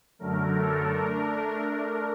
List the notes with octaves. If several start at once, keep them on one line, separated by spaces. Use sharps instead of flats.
F#2 D3 F#3 A3 A#4
A4
A3 D4 A#4